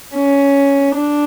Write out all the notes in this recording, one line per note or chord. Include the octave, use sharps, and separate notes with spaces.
C#4
D4